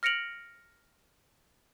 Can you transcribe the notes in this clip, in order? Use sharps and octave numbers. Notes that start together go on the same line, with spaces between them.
F6 A#6 C#7 D7 F7 F#7